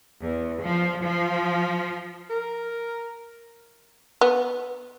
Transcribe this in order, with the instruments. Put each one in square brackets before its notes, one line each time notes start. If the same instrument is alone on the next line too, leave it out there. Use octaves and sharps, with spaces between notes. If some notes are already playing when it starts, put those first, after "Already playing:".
[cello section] E2
F3
F3
[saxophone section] A#4
[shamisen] B3